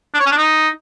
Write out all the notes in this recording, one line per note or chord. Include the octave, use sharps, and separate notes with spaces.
D4
C#5
C#4
D4
D#4